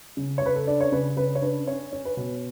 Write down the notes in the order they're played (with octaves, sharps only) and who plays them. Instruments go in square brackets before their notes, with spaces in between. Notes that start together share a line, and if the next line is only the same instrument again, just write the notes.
[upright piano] C#3
C#5
C#3 B4
A4
D4 D5
C#5
C#3 B4
C#3 B4
C#5
D4 B4
C#4 C#5
C#4
B4
B2